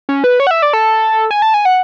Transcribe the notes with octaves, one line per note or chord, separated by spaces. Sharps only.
C#4
B4
C#5
F#5
E5
D5
A4
G#5
A5
G#5
F#5